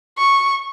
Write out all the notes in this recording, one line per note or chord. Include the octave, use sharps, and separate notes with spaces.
C#6